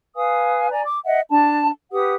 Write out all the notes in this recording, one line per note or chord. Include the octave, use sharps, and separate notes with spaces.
B4 F5 G#5 D#6
D5 G#5 A#5
D6
D#5 E5 F#5
D4 A5
G4 B4 F#5 D#6